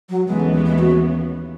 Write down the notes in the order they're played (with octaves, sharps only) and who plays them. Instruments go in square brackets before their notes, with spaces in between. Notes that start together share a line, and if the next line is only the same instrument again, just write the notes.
[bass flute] F#3
[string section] D#2 C#3 E3 B3 [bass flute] G#3
[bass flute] A3
G#3
G#3
F#4